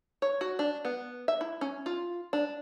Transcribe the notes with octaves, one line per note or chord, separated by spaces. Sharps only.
C#5
F#4
D4
B3
E5
E4
C#4
F4
D4